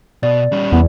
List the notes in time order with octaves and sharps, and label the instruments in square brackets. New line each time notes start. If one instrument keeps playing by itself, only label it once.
[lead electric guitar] B2 [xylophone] D5
[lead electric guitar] G3 C#4
[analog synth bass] E2 [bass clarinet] B3